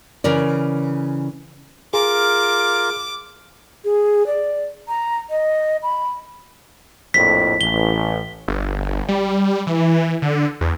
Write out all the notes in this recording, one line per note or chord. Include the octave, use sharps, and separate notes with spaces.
C#3 E3 A#4 D5
F4 G#4 A#4 D6
G#4
D5
A#5
D#5
B5
A#1 F2 A2 B6
A1 G7
G1
G3
E3
D3
E2